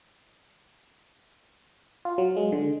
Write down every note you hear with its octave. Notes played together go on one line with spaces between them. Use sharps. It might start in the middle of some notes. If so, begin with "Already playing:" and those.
F4
F#3
G#3
D3